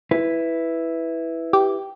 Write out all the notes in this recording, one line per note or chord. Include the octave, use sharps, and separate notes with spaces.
E4 B4
G4